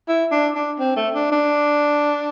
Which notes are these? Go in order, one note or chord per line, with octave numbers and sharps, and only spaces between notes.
E4
D4
D4
C4
A3
D4
D4